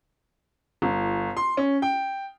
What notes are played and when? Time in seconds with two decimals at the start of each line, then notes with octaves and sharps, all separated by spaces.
0.82 G1
1.37 C6
1.57 C#4
1.82 G5